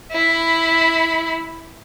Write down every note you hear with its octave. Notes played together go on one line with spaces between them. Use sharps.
E4 B5